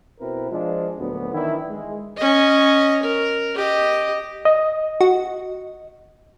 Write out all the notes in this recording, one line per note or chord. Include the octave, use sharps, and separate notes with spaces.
B2 C4 E4 A#4 B4
F3 G#3 D4 F4
D2 A#2 F#3 B3
D#3 E3 D4 E4
G#3
C#4 D#5
A#4
G4 D#5
D#5
F#4